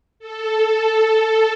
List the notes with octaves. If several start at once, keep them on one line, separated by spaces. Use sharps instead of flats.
A4
A4